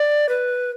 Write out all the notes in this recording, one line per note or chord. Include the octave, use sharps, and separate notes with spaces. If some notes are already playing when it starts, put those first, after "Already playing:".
Already playing: D5
B4